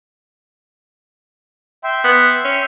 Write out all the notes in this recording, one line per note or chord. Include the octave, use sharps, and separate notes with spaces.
E5 G5 C6
B3
C#4